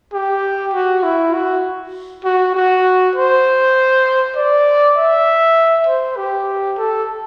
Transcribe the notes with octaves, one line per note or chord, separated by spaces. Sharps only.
G4
F#4
E4
F#4
F#4
F#4
C5
D5
E5
C5
G4
A4